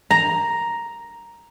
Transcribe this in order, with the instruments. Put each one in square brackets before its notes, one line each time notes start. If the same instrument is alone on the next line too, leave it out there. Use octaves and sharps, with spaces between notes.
[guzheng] A#5